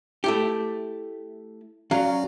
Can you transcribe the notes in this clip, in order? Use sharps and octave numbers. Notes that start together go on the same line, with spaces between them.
A3 E4 G4
F#3 C#4 F#4 D5 F5